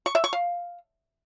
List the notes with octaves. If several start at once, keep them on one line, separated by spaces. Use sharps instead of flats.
C#6
E5
C#6
F5